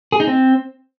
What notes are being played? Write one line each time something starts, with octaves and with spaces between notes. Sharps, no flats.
G#4
D#4
C4